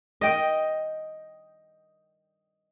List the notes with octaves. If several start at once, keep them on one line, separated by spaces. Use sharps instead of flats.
D#5 G5